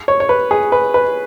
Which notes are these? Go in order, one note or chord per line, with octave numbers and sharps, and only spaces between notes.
C#5
C#5
B4
G#4
B4
B4